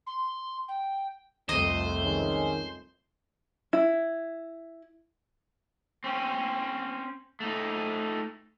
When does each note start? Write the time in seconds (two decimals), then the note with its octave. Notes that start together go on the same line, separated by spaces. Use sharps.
0.06 C6
0.68 G5
1.49 C2 F2 A3 C5 D#5
2.03 D#3 G#3 C#4
3.73 E4
6.04 C4 C#4
7.40 A3 D#4